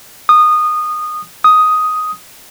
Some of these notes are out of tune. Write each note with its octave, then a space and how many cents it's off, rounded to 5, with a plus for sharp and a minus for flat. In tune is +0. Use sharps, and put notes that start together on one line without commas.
D#6 -20
D#6 +5